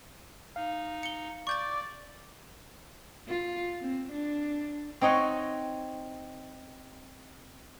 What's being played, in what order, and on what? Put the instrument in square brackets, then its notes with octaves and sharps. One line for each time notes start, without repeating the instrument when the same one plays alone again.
[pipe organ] D#4 [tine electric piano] F5
[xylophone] C#7 G7
[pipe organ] D5 [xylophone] C#6 G6 A6 [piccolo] D6
[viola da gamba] F4
C4
D4
[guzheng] C4 D#4 C#5 D#5 F#5